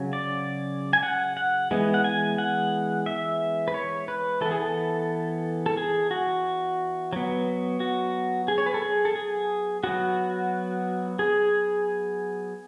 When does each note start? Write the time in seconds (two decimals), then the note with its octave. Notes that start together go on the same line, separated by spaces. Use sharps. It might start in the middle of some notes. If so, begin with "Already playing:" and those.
Already playing: C#3 F#3 C#4
0.13 D5
0.93 G#5
1.03 F#5
1.37 F#5
1.71 E3 G#3 B3
1.94 F#5
2.04 G#5
2.38 F#5
3.06 E5
3.68 B4
3.74 C#5
4.08 B4
4.41 E3 B3 A4
4.51 G#4
4.60 A4
5.66 A4
5.77 G#4
6.11 F#4
7.13 F#3 B3
7.80 F#4
8.48 G#4
8.58 C#5
8.66 B4
8.74 A4
8.82 G#4
9.05 A4
9.15 G#4
9.83 F#3 B3 F#4
11.19 G#4